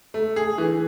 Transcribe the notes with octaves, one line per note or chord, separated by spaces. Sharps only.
A3
G#4
E3